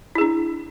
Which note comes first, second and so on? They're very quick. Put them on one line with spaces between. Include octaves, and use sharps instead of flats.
E4 G#4 D4